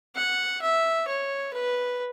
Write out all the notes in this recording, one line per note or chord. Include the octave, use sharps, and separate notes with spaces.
F#5
E5
C#5
B4